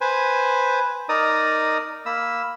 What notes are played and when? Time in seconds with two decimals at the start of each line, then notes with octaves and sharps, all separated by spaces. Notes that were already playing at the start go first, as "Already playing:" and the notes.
0.01 B4 C5 G#5
1.09 D#4 A#4 D5 A#5 D#6
2.06 A#3 B5 E6